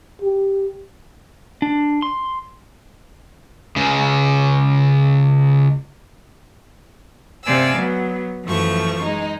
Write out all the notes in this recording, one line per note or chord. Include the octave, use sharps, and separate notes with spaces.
G4
D4
C6
C#2 C#3
C3 C5 D5 F5 G#5 E6
F#3 B3
F#2 E3 F3 A3 C#6
G#3 D#4